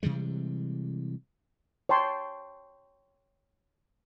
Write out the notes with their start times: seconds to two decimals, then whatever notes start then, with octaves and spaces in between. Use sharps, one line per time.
0.03 C3 E3 G3 G#3
1.89 C#5 G5 A5 C6